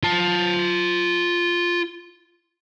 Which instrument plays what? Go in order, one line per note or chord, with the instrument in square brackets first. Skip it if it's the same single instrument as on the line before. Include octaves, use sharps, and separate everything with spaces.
[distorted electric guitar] F4 A5